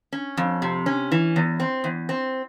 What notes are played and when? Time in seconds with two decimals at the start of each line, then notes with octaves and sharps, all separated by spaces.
0.13 C#4
0.37 F2
0.62 C3
0.86 C#4
1.12 E3
1.36 E2
1.60 C4
1.84 E2
2.09 C4